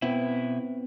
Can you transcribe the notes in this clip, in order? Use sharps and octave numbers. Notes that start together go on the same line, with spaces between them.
B2 B3 C4 E4